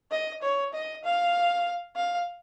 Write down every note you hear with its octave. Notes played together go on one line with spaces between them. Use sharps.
D#5
C#5
D#5
F5
F5